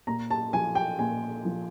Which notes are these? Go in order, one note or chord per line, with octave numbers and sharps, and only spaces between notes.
A#2 A#5
A5
F3 G#5
G5
A#2 G#5
F3